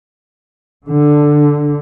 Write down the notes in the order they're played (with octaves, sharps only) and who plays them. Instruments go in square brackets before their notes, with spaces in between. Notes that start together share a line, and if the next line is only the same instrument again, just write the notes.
[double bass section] D3